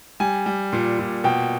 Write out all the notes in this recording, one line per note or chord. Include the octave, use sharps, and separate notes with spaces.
G3 G#5
G3
A#2
A#2
B2 G5